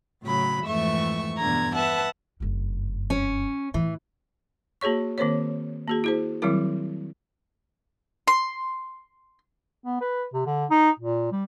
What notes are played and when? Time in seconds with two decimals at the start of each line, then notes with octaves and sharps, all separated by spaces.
0.24 A2 C#3 F#3 B5
0.64 F2 G#2 E3 A3 E5 C#6
1.38 E2 G2 B2 D3 A#5 G#6
1.75 B4 E5 F#5 A5
2.40 F#1 G2
3.10 C#4
3.74 A2 E3
4.81 A#3 F#4 G#4 C#5 C#6
5.18 D#3 A#3 C4 A#4 C5 C#5
5.88 A#3 F#4 G#4
6.04 E4 G#4 C5
6.42 D#3 F#3 G3 C4 E4 A#4
8.28 C6
9.84 B3
10.01 B4
10.33 C3
10.46 D3
10.70 D#4
10.99 A#2
11.32 G3